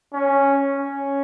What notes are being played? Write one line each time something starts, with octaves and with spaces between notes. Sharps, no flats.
C#4
C#4